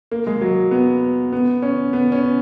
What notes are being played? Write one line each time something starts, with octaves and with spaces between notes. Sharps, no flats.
A#3
G#3
F#3
B3
B3
C#4
B3
C#4